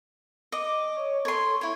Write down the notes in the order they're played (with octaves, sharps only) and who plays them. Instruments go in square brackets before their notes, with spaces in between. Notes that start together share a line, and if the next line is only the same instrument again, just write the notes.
[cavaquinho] D#5 [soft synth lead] D6
[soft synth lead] C#5
[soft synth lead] A4 [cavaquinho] C#5 C6
[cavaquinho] E4 C#5